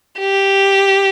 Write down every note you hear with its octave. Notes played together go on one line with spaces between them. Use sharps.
G4